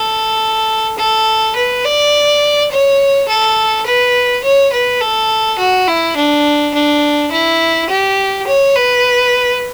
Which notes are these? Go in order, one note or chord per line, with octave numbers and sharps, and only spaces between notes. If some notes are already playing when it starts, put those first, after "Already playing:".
Already playing: A4
A4
B4
D5
C#5
A4
B4
C#5
B4
A4
F#4
E4
D4
D4
E4
G4
C#5
B4